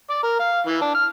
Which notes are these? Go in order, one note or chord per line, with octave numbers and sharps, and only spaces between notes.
D5
A#4
F5
E3
D4
F6